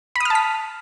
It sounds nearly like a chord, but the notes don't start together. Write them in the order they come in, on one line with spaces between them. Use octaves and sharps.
B5 D#6 F6 A5 B6